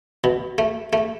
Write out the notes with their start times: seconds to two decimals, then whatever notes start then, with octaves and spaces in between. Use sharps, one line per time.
0.24 B2
0.58 A3
0.93 A3